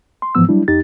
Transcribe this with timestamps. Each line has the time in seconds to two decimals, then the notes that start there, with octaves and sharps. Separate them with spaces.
0.22 C6
0.35 G#2 E3 F3 B3 E6
0.49 F#3 G3 D4 E4
0.68 F2 D#4 G4 A6